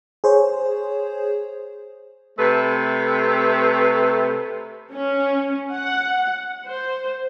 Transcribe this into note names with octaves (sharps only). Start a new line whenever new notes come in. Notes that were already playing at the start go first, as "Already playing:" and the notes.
G#4 C5 C#5
C3 A3 A4 B4
C#4
F#5
C5